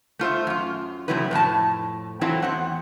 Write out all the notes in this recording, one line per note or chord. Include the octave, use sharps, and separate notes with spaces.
A3 F4 C5 E5
F#2 F4
C3 F3 F#3 A3 E4 B4
F2 A2 D4 A5
E3 F#3 A3 C4 E4 F4
E2 C4 F#5